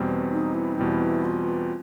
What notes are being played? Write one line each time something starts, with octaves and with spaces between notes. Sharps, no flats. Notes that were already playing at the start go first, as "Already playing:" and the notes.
Already playing: E2 B2 G3 C4
D#4
E4
D#4
E2 B2 G3 C4 E4
F4